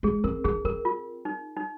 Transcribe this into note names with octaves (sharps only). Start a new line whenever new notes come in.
G#3 G#4
C4 A#4
D4 G#4
C4 A#4
F4
D#4
D#4